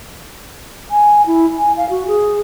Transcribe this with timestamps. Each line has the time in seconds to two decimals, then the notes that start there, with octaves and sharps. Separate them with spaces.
0.91 G#5
1.27 E4
1.58 G#5
1.77 F5
1.90 F#4
2.08 G#4